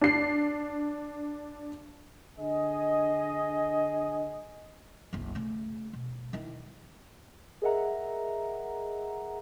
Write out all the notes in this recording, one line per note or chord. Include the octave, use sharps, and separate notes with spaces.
D4 C7
D3 G#4 D#5
F#1 C2
C#3 A3
B2
D#3 E4
G#4 A#4 D#5 E5 F#5 A#5